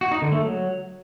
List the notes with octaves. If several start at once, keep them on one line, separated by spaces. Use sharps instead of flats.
F#4
D#4
D3
A3
F#3